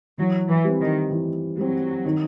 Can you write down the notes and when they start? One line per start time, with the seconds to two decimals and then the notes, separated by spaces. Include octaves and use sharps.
0.18 E3 F#3
0.49 E3
0.64 G3 C4
0.81 D#3
1.11 E3
1.58 F#3 G3 C4
2.05 D#3